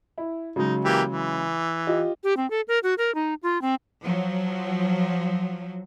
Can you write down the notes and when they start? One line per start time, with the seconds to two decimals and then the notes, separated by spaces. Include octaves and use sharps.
0.18 E4
0.56 C#3 F#3 G#3 D#4
0.84 E3 A#3 G4
1.08 E3
1.87 F4 G4 D#5
2.24 G4
2.37 C4
2.50 A4
2.68 A#4
2.83 F#4
2.98 A#4
3.15 D#4
3.43 F4
3.62 C4
4.04 F3 F#3